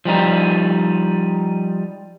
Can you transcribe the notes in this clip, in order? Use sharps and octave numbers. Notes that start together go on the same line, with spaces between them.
F3 G3 D#4